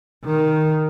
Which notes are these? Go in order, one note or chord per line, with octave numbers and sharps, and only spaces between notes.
D#3